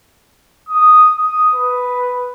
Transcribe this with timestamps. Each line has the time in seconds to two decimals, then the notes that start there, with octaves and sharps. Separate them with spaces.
0.69 D#6
1.16 D#6
1.54 B4